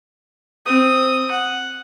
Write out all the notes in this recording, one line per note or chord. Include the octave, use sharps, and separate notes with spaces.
C4 D#6
F#5